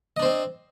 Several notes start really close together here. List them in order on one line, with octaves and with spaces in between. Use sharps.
D#5 D4 C5 C4